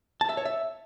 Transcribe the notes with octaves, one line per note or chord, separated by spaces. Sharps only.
A5
E5
C#5
E5